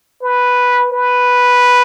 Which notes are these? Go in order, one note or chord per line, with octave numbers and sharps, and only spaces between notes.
B4
B4